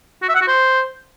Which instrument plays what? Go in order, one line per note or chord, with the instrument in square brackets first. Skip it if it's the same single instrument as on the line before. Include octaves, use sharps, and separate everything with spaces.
[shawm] F#4
E5
F#5
F#4
C5